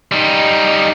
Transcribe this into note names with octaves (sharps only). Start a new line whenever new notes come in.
G3 D#4